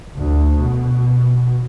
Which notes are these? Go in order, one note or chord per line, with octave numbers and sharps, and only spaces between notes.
D2
B2